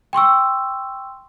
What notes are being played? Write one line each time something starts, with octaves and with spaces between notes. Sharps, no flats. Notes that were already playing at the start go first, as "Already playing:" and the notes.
G5 C6 C#6 E6